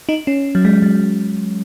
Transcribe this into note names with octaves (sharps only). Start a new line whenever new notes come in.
D#4
C#4
F#3
G#3
F#3